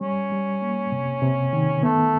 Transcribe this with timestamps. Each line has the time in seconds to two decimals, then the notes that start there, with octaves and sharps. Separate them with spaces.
0.01 G3 C#4
0.32 G3
0.62 A#3
0.92 C3
1.22 C3
1.53 D#3
1.83 A3 B3